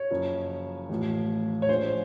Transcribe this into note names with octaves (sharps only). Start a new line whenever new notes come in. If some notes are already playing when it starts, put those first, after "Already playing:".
Already playing: C#5
F#1 F#2 F3
A1 A2 F3
C#5
A#1 A2 F3 C5